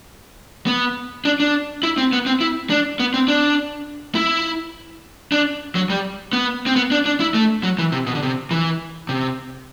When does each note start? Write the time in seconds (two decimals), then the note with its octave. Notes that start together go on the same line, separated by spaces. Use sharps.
0.67 B3
1.25 D4
1.40 D4
1.83 E4
1.98 C4
2.13 B3
2.26 C4
2.41 E4
2.70 D4
3.00 B3
3.14 C4
3.28 D4
4.15 E4
5.32 D4
5.75 F#3
5.90 G3
6.33 B3
6.66 C4
6.76 B3
6.91 D4
7.06 D4
7.20 E4
7.34 A3
7.63 F#3
7.78 E3
7.92 C3
8.07 B2
8.15 D3
8.22 C3
8.51 E3
9.09 C3